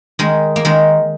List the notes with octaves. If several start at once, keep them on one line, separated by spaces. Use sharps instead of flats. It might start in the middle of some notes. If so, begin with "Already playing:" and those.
D#3 G#3
A#3
D#3 G#3